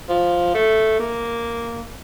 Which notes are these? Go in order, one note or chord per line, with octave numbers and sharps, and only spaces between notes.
F3
A3
A#3